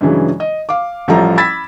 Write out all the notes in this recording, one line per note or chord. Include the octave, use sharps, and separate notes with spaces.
G2 C#3 E3 F#3 G#3
D#5
F5 D6
A1 F3 G3 A4 E5 A#5
B5 E6 G#6 A6 B6